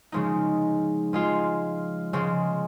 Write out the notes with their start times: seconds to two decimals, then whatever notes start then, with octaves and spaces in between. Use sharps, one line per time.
0.12 C#3 F3 G#3 D#4
1.13 F3 G#3 F4
2.13 C#3 F3 G#3